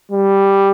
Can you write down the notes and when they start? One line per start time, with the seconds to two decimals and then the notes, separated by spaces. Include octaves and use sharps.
0.12 G3